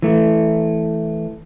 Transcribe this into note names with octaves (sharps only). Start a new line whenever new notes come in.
E3 A3